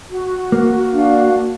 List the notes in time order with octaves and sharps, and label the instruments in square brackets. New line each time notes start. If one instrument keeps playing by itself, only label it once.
[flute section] F#4
[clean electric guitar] A#3
[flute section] D4 F#4 F5